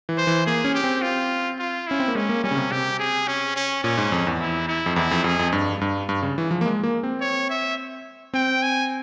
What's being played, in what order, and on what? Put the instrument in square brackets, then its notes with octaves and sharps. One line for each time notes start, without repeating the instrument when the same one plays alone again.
[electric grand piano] E3
[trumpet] C5
[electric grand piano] E3
[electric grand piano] A#3 [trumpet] G#4
[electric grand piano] C#4
[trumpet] G4
[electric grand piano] C4
[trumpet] F4
F4
[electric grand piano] C#4 [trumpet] E4
[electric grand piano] C4
A#3
[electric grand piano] G#3 [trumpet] C#4
[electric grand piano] A#3
[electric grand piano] G3 [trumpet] C#4
[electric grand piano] C#3
C3
[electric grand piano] C3 [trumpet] G4
[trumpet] G#4
C#4
C#4
[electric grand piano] A#2 [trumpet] C#4
[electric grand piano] G#2
F2
E2
[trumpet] E4
E4
[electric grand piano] F2
[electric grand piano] E2 [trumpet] E4
[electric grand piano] F2
[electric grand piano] F2 [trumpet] G#4
[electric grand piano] F2
G2
G2
G2
C#3
E3
F3
A#3
G#3
A#3
C4
[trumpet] C#5
E5
[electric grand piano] C4 [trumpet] G5
[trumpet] G#5